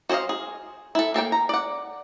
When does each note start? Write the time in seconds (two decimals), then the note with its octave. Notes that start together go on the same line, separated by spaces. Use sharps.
0.09 F#4 C5 C#5 D#5 F5
0.29 G#4
0.95 E4 A4
1.14 A#3 A4 A#4 G5
1.32 A#5
1.49 D5 F#5